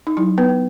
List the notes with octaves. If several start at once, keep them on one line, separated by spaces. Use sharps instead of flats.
D#4
F#3 E4
B3 B4
B3